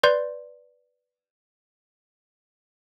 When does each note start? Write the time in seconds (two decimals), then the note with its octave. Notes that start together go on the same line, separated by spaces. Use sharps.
0.03 B4 D5 C6 G6